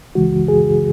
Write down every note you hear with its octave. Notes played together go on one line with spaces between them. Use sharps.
C#2 C#3 E3 G#3 F#4
G#4